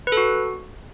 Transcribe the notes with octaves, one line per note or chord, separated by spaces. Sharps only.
B4
A4
F#4